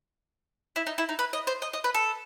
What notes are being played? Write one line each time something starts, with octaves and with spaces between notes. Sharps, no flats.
E4
D#4
E4
D#4
B4
D#5
C5
D#5
D#5
B4
A4